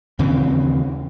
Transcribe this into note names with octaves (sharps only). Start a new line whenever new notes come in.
D#2 C#3 E3 C4